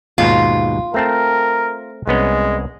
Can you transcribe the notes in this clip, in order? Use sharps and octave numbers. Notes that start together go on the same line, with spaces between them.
D#2 G#2 B2 F4
A3 C4 A#4 A5
C2 G#3 B3 C#4